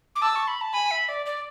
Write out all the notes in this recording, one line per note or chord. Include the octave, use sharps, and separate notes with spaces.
D6
A5 E6
C#6
B5
A5
G#5 B5
E5
D5
D5